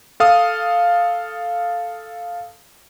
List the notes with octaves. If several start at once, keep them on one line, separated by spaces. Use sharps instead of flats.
A4 F5 D#6